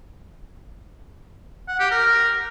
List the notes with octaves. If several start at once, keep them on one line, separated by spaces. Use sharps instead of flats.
F#5
G4
A#4